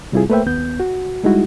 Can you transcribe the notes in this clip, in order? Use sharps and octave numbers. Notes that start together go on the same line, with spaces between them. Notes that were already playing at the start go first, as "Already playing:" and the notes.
C3 G3 C4 E4 F4 G#4
A3 A#3 B4 C5 E5 G5
D#2 B3 G6
F#4
G3 G#3 D#4 E4 F#4